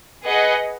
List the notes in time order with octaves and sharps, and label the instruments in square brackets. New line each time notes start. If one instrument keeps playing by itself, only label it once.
[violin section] G#4 B4 D#5 F#5